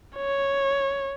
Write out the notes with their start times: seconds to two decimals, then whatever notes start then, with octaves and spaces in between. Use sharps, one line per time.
0.17 C#5